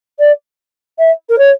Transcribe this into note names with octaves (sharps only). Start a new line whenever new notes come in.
D5
E5
A#4
C#5